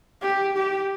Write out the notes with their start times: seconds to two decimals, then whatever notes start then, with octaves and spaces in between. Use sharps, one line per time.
0.22 G4
0.56 G4